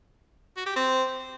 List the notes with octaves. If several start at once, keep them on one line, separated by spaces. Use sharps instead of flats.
F#4
G4
C4